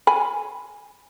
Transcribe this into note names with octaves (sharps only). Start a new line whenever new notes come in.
G#5 B5